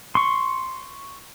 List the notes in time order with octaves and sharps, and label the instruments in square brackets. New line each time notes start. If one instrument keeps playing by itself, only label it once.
[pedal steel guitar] C6 C#6